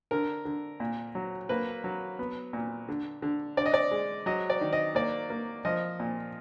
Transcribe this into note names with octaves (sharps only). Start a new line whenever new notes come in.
D3 A#4
D3
A#2
F#3
A#3 B4
F#3
B3
A#2
D3
D3
D3 D5
D#5
D5
G#3
F#3 D#5
D5
D#3
D#5
A#3 D5
A#3
F3 D#5
A#2